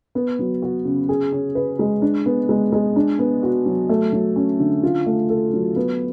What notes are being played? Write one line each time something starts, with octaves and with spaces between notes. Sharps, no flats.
B3
F#3
F#4
C#3
G#4
C#4
B4
G#3
D4
B3
G#3
G#3
D4
B3
F#4
F#3
A3
F#3
C#4
D3
F4
A3
A4
F#3
B3